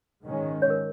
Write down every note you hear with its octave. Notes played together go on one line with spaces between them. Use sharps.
G#2 D#3 G#3 C#4
C#5
A#4